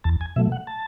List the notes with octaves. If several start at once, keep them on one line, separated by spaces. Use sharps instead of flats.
E2 A5
G#5
B2 F#3 A3 E5
F#5
A5